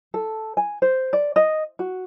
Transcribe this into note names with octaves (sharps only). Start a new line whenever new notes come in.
A4
G#5
C5
D5
D#5
F#4